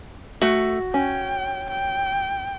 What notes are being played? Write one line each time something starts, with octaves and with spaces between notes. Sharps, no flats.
A3 F#4
C#4 G5
G5